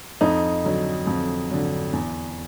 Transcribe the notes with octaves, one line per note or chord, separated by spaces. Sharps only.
F2 D#4
D3 F#3
F2
D3 F#3
E2